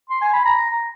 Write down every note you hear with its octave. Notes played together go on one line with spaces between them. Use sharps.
C6
G#5
B5
A#5